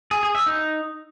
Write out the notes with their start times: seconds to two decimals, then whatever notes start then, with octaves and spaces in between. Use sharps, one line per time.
0.11 G#4
0.23 G#4
0.35 E5
0.46 D#4